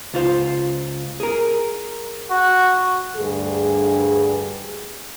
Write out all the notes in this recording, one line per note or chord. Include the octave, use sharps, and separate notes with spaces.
C#2 F4 C5
G#4 A#4
F#4
D2 G2 G#4